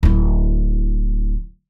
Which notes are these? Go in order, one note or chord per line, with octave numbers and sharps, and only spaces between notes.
D1 E4